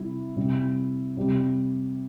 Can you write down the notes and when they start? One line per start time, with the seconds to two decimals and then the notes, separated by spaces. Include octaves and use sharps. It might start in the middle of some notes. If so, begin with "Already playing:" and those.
Already playing: C3 G3 E4
0.36 C3 G3
1.17 C3 G3